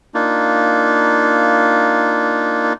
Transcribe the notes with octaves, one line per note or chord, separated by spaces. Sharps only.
A#3 D4 D#4 F4